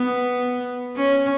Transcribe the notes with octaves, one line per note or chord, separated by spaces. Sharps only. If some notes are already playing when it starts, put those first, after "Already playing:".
Already playing: B3
C#4